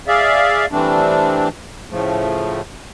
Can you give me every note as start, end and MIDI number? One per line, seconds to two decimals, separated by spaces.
0.08 0.66 68
0.08 0.66 74
0.08 0.66 76
0.08 0.66 77
0.72 1.49 52
0.72 1.49 55
0.72 1.49 57
0.72 1.49 60
0.72 1.49 62
1.91 2.61 45
1.91 2.61 49
1.91 2.61 53
1.91 2.61 57